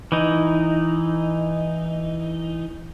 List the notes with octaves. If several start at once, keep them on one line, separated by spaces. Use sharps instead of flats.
E3 D#4